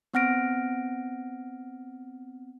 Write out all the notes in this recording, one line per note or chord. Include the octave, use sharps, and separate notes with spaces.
B3 C4 F#5 F6 A#6 D7